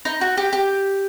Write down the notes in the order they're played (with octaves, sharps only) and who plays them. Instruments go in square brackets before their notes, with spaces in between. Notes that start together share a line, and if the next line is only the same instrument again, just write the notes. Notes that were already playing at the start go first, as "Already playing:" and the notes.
[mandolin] D#4
F#4
G4
G4